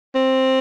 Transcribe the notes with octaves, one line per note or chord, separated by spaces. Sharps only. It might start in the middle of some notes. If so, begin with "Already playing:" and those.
C4